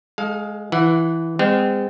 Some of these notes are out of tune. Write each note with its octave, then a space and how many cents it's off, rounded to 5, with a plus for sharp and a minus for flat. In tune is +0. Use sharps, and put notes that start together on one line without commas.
G#3 +5 A4 -30 F5 +15
E3 +0 F#5 -10
G#3 -40 C4 -35